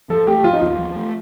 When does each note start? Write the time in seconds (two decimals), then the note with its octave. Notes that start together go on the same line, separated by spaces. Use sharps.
0.10 F3 A4
0.27 A3 G4
0.44 F3 F4
0.53 D#4
0.62 D#2 F4
0.78 F3
0.96 A3